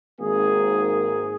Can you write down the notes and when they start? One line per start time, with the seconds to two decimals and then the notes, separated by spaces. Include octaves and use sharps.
0.20 G#1 G#2 D#3 A#3 G#4